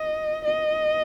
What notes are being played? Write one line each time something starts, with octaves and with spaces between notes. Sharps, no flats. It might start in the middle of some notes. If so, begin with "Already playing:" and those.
Already playing: D#5
D#5